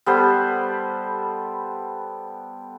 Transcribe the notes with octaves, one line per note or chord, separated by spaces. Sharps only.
G3 B3 A4 C5